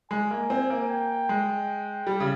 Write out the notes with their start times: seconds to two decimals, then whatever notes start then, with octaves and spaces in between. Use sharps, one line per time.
0.11 G#3 G#5
0.31 A#3
0.50 C4
0.70 A#3
0.90 G5
1.29 G#3
2.07 G3
2.20 C#3